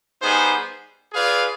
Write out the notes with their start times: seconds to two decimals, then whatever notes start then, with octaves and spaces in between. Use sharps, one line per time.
0.22 G3 B3 D#4 G#4 C5
1.13 F4 G#4 B4 D5 F5